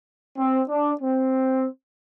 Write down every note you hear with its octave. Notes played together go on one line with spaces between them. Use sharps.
C4
D4
C4